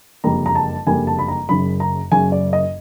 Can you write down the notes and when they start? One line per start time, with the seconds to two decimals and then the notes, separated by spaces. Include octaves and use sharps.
0.24 F#1 F2 D3 G3 A#3 A#5
0.46 A#5
0.55 A5
0.86 F#1 F2 D3 G3 A#3 G#5
1.07 A5
1.19 B5
1.28 A#5
1.49 F#1 F#2 C#3 F#3 B5
1.80 A#5
2.11 F#1 F#2 C#3 F#3 G#5
2.32 D5
2.53 D#5